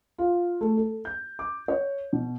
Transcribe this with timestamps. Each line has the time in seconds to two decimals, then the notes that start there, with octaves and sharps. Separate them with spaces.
0.18 F4
0.61 A3
0.77 A4
1.05 G6
1.39 D6
1.68 C#5
2.13 B2